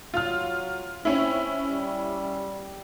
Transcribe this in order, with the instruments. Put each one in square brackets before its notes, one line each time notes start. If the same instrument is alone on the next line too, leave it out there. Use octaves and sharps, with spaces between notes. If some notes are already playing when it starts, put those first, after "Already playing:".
[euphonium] F#3 [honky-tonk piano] F4 F6
[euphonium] C4 [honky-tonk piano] C#4 E4
[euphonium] G3